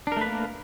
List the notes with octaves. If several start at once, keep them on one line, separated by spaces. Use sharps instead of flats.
A3 A#3 D4 A#4 B4